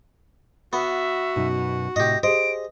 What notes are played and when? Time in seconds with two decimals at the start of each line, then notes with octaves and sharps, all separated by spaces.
0.73 B3 F#4 E5
1.36 F#2 B2 D#4
1.96 A2 C3 G4 D#5 A#6
2.23 G4 G#4 C5 D#5 D7